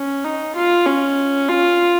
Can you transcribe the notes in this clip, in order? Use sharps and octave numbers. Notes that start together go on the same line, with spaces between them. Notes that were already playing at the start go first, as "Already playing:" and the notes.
Already playing: C#4
D#4
F4
C#4
F4